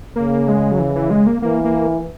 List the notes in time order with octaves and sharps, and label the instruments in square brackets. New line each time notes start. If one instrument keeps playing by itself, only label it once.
[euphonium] C#3 [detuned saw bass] A#3
[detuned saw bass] G#3
F#3
E3
E3
G#3
A#3
[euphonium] E3 [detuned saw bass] A#3
[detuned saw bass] A#3